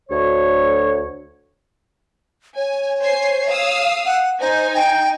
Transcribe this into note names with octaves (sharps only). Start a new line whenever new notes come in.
D2 C#5
C#5 G#5
C5 G#5 C7
F5 D#6 E6
F#5
D#4 C5 G#5
G5